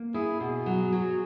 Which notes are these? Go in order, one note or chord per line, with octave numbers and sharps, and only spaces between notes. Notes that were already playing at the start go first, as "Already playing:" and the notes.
Already playing: A#3
E4 G#4
B2 G#4
F#3
F#3